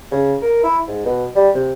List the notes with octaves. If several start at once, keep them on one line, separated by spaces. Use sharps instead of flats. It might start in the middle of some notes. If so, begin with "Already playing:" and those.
C#3
A#4
E4
G#2
B2
G3
C3